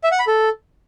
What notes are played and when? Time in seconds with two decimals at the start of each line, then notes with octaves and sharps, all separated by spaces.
0.04 E5
0.12 F#5
0.19 B5
0.27 A4